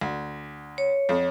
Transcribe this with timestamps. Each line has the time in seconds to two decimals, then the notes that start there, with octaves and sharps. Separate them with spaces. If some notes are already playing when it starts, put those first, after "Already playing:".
0.01 D2
0.78 C#5
1.09 F2